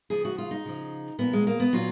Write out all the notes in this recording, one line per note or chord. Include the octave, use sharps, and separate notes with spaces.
C#3 F3 G#4
F#4
F4
D#4
C#3 F3
A#2 F3 B3
G#3
A#3
B3
A#2 F#3 F4